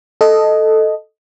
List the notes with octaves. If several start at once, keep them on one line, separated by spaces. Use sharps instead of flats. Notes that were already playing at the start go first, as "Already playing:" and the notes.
A4 D#5